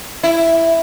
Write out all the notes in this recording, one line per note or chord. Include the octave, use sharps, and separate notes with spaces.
E4